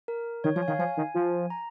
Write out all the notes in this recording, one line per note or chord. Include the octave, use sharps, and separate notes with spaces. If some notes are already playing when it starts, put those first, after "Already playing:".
A#4
D#3 C#5
F3 C#5
G#5
D#3 F5
F3 G#5
D#3
F3
A#5